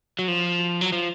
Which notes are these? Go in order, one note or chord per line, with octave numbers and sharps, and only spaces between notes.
F#3
F3
F#3
F3